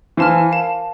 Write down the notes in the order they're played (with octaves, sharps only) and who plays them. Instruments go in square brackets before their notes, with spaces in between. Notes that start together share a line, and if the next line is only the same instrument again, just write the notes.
[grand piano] E3 [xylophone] C5 F5 A5 C6 F6
[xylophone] A#4 F5 A5